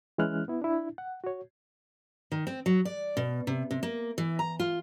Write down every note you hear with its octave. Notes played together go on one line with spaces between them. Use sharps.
E3 G#3 C#4 E4 F6 F#6
B3 E4
D4 E4
F#5
F#4 C#5
D#3
C4
F#3
D5
B2
C3
C3
A#3
E3
A#5
F4